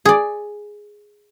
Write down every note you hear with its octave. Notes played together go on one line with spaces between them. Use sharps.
G#4 D5